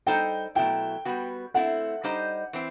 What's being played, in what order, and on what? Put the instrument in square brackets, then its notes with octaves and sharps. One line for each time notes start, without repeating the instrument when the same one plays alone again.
[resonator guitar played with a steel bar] G3 D#4 A4 C5 D#5 [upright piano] G5
[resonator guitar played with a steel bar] B2 F#3 A3 E4 [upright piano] G5
[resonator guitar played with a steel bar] G3 B3 F#4
[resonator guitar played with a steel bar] A3 C4 E4 [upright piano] F#5
[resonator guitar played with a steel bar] G3 D#4 G4 C5 D#5
E3 C4